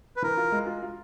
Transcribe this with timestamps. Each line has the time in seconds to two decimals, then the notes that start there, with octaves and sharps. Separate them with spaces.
0.16 B4
0.22 E3 A#4
0.37 F4
0.52 G#3
0.67 F4
0.82 F4